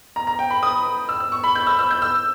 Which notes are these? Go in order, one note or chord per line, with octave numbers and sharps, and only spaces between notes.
A#5
A#5
G5
B5
D#6
E6
E6
C#6
B5
G6
E6
E6
G6
E6